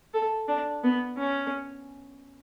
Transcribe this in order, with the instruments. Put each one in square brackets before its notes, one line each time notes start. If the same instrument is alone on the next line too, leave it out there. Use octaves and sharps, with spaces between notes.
[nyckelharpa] A4
D4
B3
C#4